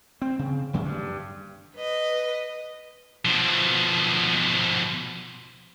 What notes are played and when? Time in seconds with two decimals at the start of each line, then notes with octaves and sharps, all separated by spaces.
0.22 C4
0.39 C#3
0.73 A#1 F#2 C#3 A#3
0.85 G2
1.77 B4 D#5
3.25 B2 F3